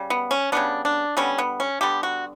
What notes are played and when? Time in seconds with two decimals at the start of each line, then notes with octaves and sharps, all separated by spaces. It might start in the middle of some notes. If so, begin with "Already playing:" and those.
Already playing: C#3 G3
0.10 B3
0.31 C#4
0.52 C#3 G3 B3 D4
0.85 D4
1.17 D3 G3 B3 C#4
1.38 B3
1.60 C#4
1.81 D3 G3 B3 G4
2.03 F#4